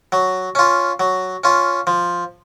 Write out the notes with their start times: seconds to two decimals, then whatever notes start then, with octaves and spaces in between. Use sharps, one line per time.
0.12 F#3
0.55 C#4 F4
1.00 F#3
1.44 C#4 F4
1.87 F3